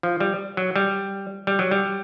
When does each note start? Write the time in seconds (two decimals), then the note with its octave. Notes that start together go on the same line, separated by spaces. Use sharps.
0.03 F3
0.20 G3
0.57 F#3
0.76 G3
1.47 G3
1.59 F#3
1.71 G3